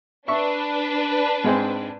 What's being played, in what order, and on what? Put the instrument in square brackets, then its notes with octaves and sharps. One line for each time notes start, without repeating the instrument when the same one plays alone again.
[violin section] D4 B4 [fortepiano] E5 C#6
[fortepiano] G#2 G#3 C4